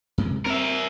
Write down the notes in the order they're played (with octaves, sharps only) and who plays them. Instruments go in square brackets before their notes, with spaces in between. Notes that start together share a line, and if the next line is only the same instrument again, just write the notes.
[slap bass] F#2 C3 G#3
[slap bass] C4 [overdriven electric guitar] A#4 E5